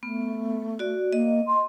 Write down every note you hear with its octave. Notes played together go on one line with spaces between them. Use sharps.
A3 B3
F#4 D5
A#3 D#5
C6